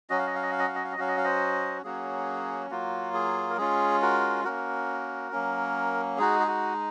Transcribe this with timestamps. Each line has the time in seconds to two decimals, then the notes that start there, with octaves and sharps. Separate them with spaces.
0.10 F#3 C#4 F#4 D#5
0.18 F5
0.27 D#5
0.35 F5
0.43 D#5
0.52 F5
0.59 D#5
0.68 F5
0.75 D#5
0.84 F5
0.92 D#5
0.98 F#3 C#4 F#4 F5
1.08 D#5
1.17 F5
1.24 C5 D#5
1.84 F#3 A#3 C#4 F#4 G#4
2.70 F#3 A#3 F4 F#4
3.14 G#4
3.50 A#4
3.57 G#3 C#4 F4 G#4
4.02 F#4 A#4
4.44 A#3 C#4 F#4 A#4
5.32 F#3 A#3 C#4
6.18 G#3 D#4 F#4 G#4
6.40 G#4
6.48 F#4